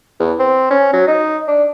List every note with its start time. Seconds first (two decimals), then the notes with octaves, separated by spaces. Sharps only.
0.20 E2
0.39 C4
0.71 C#4
0.93 F#3
1.08 D#4
1.48 D4